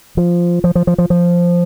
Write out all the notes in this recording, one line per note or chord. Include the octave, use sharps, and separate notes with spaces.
F3
F3
F3
F3
F3
F3